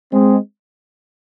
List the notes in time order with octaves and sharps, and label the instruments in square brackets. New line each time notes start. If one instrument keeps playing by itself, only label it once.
[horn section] G#3 C4